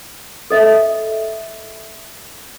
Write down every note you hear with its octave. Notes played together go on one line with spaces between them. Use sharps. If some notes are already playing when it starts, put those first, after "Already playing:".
A4 D#5 E5